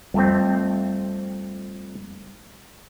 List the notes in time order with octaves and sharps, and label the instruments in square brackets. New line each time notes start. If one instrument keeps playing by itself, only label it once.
[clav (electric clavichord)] F2 A3 C4 [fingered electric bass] G3